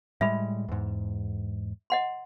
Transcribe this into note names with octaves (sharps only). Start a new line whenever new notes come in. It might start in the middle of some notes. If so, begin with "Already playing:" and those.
A2 G3 G#3 E5 B5
E2 G#2
D#5 F#5 C6